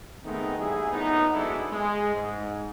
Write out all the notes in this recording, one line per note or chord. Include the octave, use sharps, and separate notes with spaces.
D#3 G#3 A3 B3 C4 D#4
A1 G#2 G3 E4 G#4
A#1 A2 B3 D#4
F#3 G#3 B3 D4 E4 A4
G#3
G#2